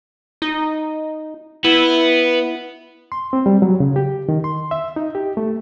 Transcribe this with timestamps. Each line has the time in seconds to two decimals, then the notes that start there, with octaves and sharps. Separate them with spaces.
0.42 D#4
1.64 B3 E4
3.12 C6
3.33 C4
3.46 G3
3.62 F#3
3.80 C#3
3.96 G4
4.29 D#3
4.44 C6
4.71 E5
4.96 D#4
5.15 G4
5.37 A3